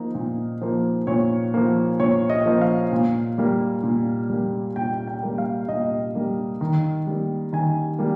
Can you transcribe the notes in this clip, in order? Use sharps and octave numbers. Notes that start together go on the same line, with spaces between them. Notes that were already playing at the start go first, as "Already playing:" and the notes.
Already playing: F3 A#3 D#4
A#2
F3 A#3
A#2 C#5
F3 A#3
A#2 C#5
D#5
F3 A#3
F5
A#2
G3 A#3
A#2
G3 A#3
A#2 G5
G5
G3 A#3
F5
A#2 D#5
G3 A#3
D#3
G3 A#3
D#3 G#5
G3 A#3